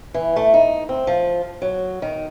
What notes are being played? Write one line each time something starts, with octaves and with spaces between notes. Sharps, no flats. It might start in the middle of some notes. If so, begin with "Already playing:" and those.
E3
A3
D#4
C4
F3
F#3
D#3